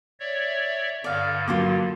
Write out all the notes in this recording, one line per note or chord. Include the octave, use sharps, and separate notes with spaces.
C#5 D5 E5
G2 D3 D5 F5
F#3 A#3 F4 C6 D6